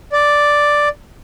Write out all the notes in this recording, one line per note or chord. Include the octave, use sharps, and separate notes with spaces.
D5